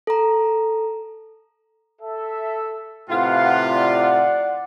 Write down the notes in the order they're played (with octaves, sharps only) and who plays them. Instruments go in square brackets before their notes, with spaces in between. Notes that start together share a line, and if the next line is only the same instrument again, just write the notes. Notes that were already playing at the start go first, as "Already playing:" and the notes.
[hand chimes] A4 A#5
[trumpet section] A4 E5
[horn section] A2 C3 F4 [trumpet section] B4 F5 F#5
[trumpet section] D5 F#5